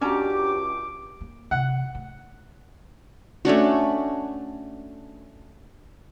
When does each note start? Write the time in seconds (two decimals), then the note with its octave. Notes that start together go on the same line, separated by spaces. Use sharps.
0.01 C#2 C#4 D4 F#4 G4 A5 A#5 D6
1.21 A#3
1.51 C3 E3 F#5
1.95 A3
3.45 A3 C#4 D4 F#4